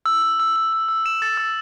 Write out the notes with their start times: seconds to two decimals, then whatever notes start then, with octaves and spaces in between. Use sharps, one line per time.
0.06 E6
0.22 E6
0.40 E6
0.56 E6
0.73 E6
0.88 E6
1.06 E7
1.22 A6
1.37 E6